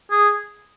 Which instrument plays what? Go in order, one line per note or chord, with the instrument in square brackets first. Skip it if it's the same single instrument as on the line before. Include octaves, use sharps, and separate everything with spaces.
[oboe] G#4